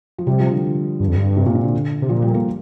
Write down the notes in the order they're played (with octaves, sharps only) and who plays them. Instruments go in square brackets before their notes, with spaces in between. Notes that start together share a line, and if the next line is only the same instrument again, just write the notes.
[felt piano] F3
[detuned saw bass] C3 [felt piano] G3
[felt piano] F3
D3
[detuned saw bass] G2
F2
G2
[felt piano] C3
A#2
C3
D3
[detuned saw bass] C3
[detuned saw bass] A#2 [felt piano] F3
[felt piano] G3
A#3